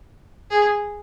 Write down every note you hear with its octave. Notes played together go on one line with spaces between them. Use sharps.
G#4